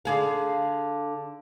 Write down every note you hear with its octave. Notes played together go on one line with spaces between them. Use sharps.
D3 G#4 F5